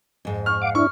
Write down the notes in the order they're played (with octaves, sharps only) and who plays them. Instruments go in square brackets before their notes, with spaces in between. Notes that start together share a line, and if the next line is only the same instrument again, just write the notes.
[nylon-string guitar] F2 G#2
[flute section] C#6 [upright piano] F6
[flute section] F5 F#5 [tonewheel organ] D6
[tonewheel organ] D4 E4 [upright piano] C#6 [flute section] F6